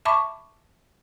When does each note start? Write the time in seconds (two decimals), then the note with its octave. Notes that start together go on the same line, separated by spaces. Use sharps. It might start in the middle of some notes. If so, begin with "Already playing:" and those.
0.05 E5 A5 B5 C#6 D6